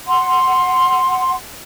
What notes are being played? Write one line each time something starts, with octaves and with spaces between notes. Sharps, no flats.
F#5 C6